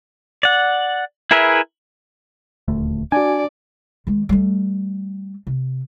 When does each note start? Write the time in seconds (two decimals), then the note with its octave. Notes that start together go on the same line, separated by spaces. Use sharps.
0.43 D5 F#5
1.31 E4 G#4 A#4 B4 E5
2.68 D#1 D2 A3
3.12 D4 F#4 D5 G#5
4.07 D#3 G#3
4.29 G3 A3
5.47 C3